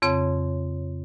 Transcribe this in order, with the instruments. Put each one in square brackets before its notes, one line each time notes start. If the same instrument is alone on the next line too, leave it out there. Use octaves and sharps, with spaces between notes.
[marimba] F2 C#3 C4 C#5